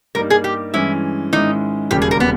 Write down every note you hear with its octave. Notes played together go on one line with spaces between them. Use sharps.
G2 G3 A#3 D#4 A#4
G#4
G4
G2 E3 G#3 C#4 E4
G#2 D#3 G#3 C#4 D#4 E4
E1 D#2 C#3 G3 A#3 G4
G#4
A#4
B3